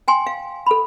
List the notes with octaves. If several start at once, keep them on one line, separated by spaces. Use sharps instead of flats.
G5 G#5 C6
F5
A4 B5